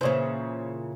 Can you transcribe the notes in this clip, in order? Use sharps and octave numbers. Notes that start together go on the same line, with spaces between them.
A#2 C#3 E3 C5 C#5